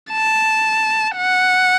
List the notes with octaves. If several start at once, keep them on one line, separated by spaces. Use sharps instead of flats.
A5
F#5